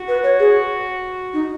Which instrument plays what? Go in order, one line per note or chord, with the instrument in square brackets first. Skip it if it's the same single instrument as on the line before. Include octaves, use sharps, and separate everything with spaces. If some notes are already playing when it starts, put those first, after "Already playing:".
Already playing: [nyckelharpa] F#4
[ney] B4
C#5
G#4
D#4